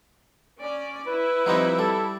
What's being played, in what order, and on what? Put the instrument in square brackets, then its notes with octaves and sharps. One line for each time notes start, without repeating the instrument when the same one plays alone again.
[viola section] C#4 D5
[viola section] E4 [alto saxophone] B4
[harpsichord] F3 G3 C4 [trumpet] D#4
[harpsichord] G3 [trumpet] A4